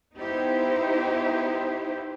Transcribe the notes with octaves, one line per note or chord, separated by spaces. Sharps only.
B3 D#4 E4 G4 C5